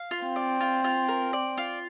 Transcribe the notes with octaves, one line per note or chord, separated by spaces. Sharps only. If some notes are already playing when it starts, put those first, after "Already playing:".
Already playing: F5
F4
C4
D5
F4
F4
A#4
D5
F4